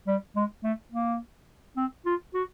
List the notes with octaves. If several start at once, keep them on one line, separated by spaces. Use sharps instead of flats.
G3
G#3
A3
A#3
C4
F4
F#4